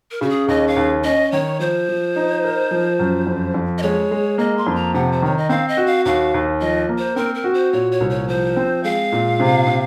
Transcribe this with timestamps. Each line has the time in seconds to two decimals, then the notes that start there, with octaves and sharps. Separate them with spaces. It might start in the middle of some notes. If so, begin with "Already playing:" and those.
0.11 A#4
0.21 C#3 F#4
0.30 G#4
0.48 D#2 D#5
0.68 F5
0.76 D#2
1.04 C#4 D#5
1.32 D#3 C#5
1.59 F3 C5
1.88 F3
2.16 D#4
2.44 A#4
2.71 F3
2.99 F#2
3.27 F2
3.54 F2
3.78 D#5
3.82 G#3 C#5
4.11 G#3
4.38 A#3 D#5
4.58 C6
4.67 F2
4.75 A#5
4.94 C3 F#5
5.12 C5
5.22 D#3 C#5
5.38 D#5
5.49 C4 F5
5.68 D#5
5.77 F#4
5.87 F5
6.05 D#2 F5
6.34 D#2
6.61 F3 D#5
6.89 A#3
6.98 C5
7.16 C4 A#4
7.35 A#4
7.44 F#4
7.54 C5
7.73 A#2 C#5
7.92 C#5
8.00 C2
8.10 C#5
8.28 F3 C5
8.56 C4
8.84 G#3 F5
9.12 A#2
9.40 C3
9.67 C3